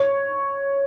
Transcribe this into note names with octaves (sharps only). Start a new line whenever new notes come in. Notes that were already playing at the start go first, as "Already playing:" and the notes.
Already playing: C#5